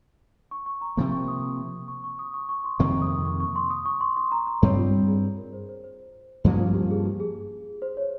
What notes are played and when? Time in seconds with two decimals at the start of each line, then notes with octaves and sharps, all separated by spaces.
0.51 C#6
0.66 C#6
0.81 A#5
0.97 C3 F3 A#3
1.12 C#6
1.28 D#6
1.88 C#6
2.04 C#6
2.19 D#6
2.34 C#6
2.49 C#6
2.64 C6
2.79 F2 C3 D#3 A#3 C#6
3.02 D#6
3.25 C#6
3.40 C#6
3.56 C6
3.70 D#6
3.85 C#6
4.01 C6
4.17 C6
4.32 A#5
4.47 A#5
4.62 G2 G3 C4 C#5
4.77 F4
5.08 G#4
5.23 G#4
5.38 A#4
5.53 C5
5.69 C5
5.84 C5
6.44 G2 F3 A#3 C#4 G4
6.60 F4
6.75 G4
6.91 G#4
7.05 G4
7.20 G#4
7.82 C5
7.97 C#5